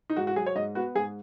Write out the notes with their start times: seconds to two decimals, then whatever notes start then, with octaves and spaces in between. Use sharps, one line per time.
0.10 D#4
0.16 G#2 F#4
0.27 F#4
0.36 F#3 G#4
0.46 C#5
0.55 G#2 D#5
0.75 B3 F#4
0.95 G#2 G#4